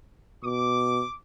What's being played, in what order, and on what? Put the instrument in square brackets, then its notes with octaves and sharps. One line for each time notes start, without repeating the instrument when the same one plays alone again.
[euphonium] B2 [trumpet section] D6